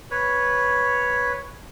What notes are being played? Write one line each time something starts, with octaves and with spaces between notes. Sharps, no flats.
B4 C#5